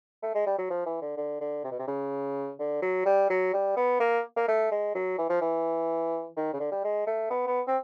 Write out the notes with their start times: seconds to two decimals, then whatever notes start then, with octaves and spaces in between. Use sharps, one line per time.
0.23 A3
0.35 G#3
0.46 G3
0.58 F#3
0.70 F3
0.86 E3
1.02 D3
1.17 D3
1.41 D3
1.64 C3
1.71 B2
1.79 C3
1.87 C#3
2.59 D3
2.82 F#3
3.06 G3
3.30 F#3
3.54 G3
3.77 B3
4.00 A#3
4.36 A#3
4.48 A3
4.72 G#3
4.95 F#3
5.18 E3
5.30 F3
5.41 E3
6.37 D#3
6.53 C#3
6.60 D3
6.72 G3
6.84 G#3
7.07 A3
7.31 B3
7.47 B3
7.68 C4